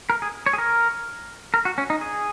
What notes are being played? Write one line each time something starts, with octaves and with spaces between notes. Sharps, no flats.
A#4
G#4
C#5
G#4
A#4
A#4
F#4
C#4
D#4
G#4